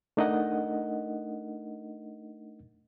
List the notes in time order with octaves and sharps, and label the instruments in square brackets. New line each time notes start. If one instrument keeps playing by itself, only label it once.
[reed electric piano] A3 D4 D#4 A#4 D#5 F#5